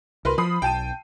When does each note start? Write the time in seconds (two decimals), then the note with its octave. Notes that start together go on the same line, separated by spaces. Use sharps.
0.25 C2 A#4 B4 C6
0.38 F3 B5 D#6 C7
0.62 B1 G5 A5 D#7